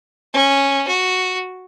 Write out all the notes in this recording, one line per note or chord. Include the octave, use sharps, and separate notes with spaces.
C#4
F#4